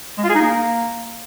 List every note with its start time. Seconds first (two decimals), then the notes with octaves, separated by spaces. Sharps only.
0.18 G#3
0.24 F4
0.29 G#4
0.35 D#4
0.41 A#3